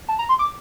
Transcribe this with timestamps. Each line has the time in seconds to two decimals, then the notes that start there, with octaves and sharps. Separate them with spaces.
0.08 A5
0.19 A#5
0.29 C6
0.39 D6